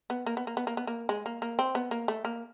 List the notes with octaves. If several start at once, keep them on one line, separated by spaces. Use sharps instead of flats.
B3
A#3
B3
A#3
B3
A#3
B3
A#3
G#3
A#3
A#3
C4
B3
A#3
A3
A#3